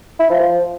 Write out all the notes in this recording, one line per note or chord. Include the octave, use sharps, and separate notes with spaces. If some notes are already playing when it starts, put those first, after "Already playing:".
E4
F3
F3